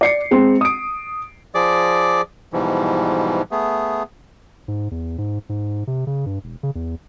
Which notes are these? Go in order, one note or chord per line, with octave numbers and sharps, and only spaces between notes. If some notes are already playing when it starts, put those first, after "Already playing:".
D5 C7 C#7
G#3 C4
D#6 D7
F3 G#4 D5 D6
G#2 B2 E3 F3 G3
A3 B3 G#4
G#2
E2
G#2
G#2
C3
C#3
G2
E1
C#3
E2